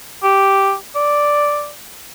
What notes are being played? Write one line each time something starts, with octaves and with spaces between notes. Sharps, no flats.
G4
D5